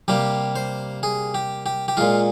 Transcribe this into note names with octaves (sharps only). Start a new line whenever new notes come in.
C3 G3 A#3 G4
C5
G#4
G4
G4
G4
A#2 G#3 F4